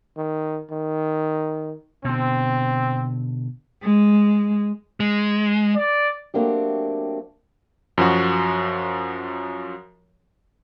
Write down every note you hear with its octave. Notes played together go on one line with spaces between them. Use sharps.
D#3
D#3
B2 D3 C4
G#3
G#3
D5
F#3 A3 A#3 C4 D4 G4
F#2 F3 F#4